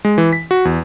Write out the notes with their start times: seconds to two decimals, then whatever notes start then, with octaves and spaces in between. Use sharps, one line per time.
0.05 G#3
0.18 E3
0.33 B6
0.51 F#4
0.65 E2